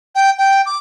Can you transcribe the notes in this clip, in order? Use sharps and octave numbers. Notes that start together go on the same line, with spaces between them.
G5
G5
D6